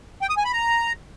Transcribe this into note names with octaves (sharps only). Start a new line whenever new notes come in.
G5
D#6
G#5
B5
A#5